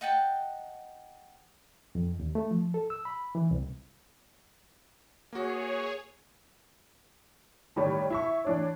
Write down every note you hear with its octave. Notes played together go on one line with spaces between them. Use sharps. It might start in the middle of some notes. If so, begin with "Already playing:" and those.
D#5 F#5 G5 A5
F2
D#2
A3
F3
A4
E6
B5
E3
C2
A#3 F#4 G#4 C#5
G1 A2 D#3 G3 C#5
E4 E5 C#6
E3 D4 C#5